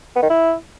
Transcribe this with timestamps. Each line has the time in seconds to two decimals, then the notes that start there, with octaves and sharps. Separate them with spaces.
0.16 B3
0.23 D#3
0.30 E4